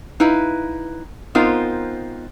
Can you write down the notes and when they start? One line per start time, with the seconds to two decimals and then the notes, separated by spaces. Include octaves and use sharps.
0.20 D#4 E4 B4 F5
1.35 B3 C4 D#4 F4 A#4 C5